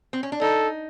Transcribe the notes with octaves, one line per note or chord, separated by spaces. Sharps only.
C4
C#4
D4
D#4 A4